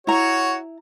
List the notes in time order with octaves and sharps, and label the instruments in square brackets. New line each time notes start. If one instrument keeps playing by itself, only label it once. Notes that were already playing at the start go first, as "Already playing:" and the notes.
[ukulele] E4 A#5 [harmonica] F#4 C#5